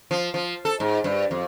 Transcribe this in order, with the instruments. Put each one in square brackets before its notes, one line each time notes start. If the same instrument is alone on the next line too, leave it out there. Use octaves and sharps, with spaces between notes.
[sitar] F3
F3
A4
G#2
G2
F2